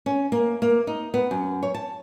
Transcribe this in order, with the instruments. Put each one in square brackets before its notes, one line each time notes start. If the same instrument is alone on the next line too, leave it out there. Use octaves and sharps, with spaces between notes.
[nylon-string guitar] C#4
A#3
A#3
D#4
B3
F#2
C#5
A5